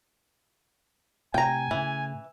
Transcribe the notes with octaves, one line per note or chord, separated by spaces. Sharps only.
A2 C3 G5 G#5 A#5
A2 C#3 E3